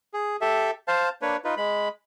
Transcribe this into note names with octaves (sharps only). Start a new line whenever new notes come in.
G#4
G4 A4 E5
C5 F5 A5
A#3 D4 B4 C#5
D#4 F4 B4
G#3 B5